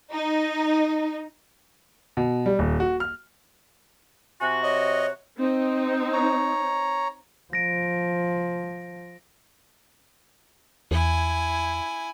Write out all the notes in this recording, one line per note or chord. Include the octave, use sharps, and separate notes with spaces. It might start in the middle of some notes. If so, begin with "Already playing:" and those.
D#4
B2
G3
D#1
F#4
F6
C3 F#4 G#5
C#5 D#5
C4 D#4
C#5 A#5
F3 A#6 D7
E2 E4 G#5